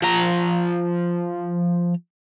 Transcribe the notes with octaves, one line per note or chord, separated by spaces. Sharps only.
F3 A#5